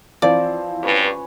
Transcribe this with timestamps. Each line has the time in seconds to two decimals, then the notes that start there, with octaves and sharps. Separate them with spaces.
0.22 E3 F3 C4 D5 B5 D#6
0.83 G2 C#4 B4 C#5